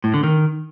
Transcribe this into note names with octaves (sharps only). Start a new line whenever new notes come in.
A2
D3
D#3